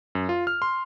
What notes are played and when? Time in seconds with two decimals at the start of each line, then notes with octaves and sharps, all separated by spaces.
0.15 F#2
0.29 F4
0.47 F6
0.62 C6